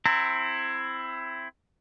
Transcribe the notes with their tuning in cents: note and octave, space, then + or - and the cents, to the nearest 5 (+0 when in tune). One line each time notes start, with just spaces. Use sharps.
C4 +0 E4 +15 A#5 -30